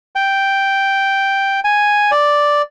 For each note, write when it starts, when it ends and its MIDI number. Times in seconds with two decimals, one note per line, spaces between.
0.16 1.60 79
1.64 2.11 80
2.11 2.62 74